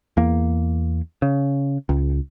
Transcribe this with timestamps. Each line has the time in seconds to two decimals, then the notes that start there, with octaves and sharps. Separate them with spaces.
0.17 E2 A#3
1.22 C#3
1.89 C#2